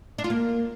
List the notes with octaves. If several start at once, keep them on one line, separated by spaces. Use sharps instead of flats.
D4
F4
A#3